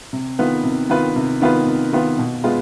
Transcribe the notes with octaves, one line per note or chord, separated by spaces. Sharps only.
C3
D#3 B3 F4 B4
C3
D#3 B3 F4 B4
C3
D#3 B3 F4 B4
C3
D#3 B3 F4 B4
B2
G#3 B3 F4 B4